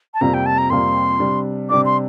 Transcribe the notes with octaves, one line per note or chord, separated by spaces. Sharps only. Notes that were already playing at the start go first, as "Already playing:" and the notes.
A5
F2 C3 G3 A#3 A#5
G5
A5
A#5
F2 C3 G3 A#3 C6
C3 G3 D4
C3 G3 D4 D6
C6